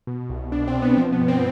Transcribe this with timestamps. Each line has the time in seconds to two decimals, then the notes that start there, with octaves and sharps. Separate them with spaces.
0.07 B2
0.29 C2
0.52 B2 D4
0.68 C4
0.74 B2
0.82 B3
0.97 F3 C4
1.12 B3
1.20 G2
1.28 C4